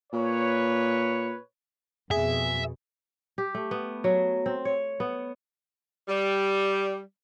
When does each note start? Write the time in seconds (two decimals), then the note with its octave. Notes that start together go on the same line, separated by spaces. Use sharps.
0.13 A#2 B4 C#5
2.11 F2 B2 G#4 E5
3.38 G4
3.55 A3
3.71 B3
4.04 F#3
4.46 C4
4.65 C#5
5.00 B3
6.08 G3